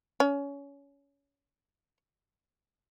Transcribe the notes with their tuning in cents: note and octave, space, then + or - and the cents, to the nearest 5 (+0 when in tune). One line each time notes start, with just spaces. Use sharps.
C#4 +25